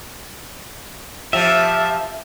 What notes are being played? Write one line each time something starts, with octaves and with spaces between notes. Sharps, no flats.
F3 G4 E5